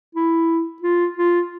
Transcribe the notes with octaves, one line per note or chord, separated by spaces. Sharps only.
E4
F4
F4